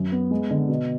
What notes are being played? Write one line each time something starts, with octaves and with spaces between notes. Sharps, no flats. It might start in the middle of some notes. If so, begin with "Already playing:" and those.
Already playing: F#2
B3
G#3
D3
B2